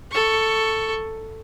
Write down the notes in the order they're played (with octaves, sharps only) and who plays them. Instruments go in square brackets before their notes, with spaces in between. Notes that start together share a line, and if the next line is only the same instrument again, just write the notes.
[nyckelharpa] A4 C#6